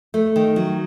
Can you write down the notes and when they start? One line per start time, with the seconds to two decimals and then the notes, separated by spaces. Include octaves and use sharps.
0.14 A3
0.36 D#3
0.56 F#3